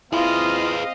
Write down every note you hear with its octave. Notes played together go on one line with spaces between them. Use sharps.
C4 E4 F4 G#4 B4 D#5 F5